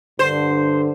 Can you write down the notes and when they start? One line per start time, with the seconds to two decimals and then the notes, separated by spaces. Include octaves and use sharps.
0.19 G2 D3 C5